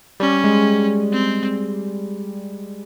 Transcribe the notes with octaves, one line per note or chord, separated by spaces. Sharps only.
G3 C#4
G#3
C4